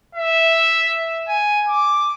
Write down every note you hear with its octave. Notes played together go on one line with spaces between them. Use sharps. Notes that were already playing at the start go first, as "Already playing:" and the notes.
E5
G#5
D6